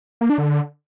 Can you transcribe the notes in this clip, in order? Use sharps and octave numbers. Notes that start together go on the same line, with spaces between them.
A#3
D4
D3